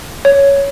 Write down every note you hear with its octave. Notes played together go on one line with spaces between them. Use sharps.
C#5